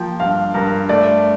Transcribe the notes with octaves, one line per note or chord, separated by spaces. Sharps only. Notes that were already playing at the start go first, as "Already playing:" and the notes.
Already playing: F3 A#3 G5
G2 F5
G2 A#4
A3 D5